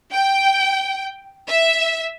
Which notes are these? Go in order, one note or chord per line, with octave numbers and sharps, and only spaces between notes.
G5
E5